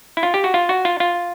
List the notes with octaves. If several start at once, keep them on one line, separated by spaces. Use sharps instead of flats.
E4
F4
G4
F#4
F4
F#4
F4
F4